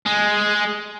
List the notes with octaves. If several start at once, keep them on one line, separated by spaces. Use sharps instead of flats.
G#3